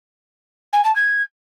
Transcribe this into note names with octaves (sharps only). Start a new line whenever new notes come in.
G#5
A5
G#6